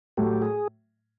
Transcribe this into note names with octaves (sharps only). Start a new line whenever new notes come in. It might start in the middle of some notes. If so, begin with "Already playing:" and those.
A2 F#3 A3 G4
G#4